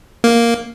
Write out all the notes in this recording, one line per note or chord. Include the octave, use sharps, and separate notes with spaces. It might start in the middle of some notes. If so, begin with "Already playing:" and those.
A#3